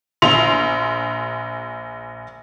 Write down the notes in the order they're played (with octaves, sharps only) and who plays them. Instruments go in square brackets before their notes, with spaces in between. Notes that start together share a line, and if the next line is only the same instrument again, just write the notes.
[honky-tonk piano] A#1 C6 F7